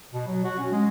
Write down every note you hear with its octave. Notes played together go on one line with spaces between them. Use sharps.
B2
F#3
F#4
C#4
G#3